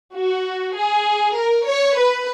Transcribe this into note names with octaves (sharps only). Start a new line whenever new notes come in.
F#4
G#4
A#4
C#5
B4